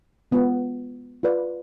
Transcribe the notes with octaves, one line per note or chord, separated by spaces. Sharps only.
G#3 B3 F4
F4 B4 D5